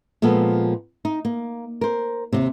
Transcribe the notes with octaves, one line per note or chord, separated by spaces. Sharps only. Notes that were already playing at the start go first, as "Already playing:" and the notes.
A#2 F3 G#3 B3 A4
D#4
A#3
A#4 C5
D#2 G#2 C3